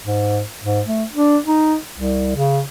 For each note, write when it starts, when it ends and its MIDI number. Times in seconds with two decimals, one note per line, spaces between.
0.04 0.42 44
0.64 0.81 44
0.87 1.03 57
1.13 1.37 62
1.46 1.75 63
1.94 2.33 36
2.36 2.61 49